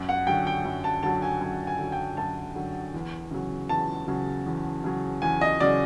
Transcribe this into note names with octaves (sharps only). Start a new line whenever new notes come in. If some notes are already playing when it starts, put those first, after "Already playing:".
Already playing: F#2
F#5
D3 F#3 G5
G5
F#2
A5
D3 F#3 A5
G#5
F#2 G#5
G#5
D3 F#3
G5
F#2 A5
D3 F#3
E2
C#3 F#3
E2 A5
C#3 F#3
E2
C#3 F#3
E2 G#5
D#5
C#3 F#3 D5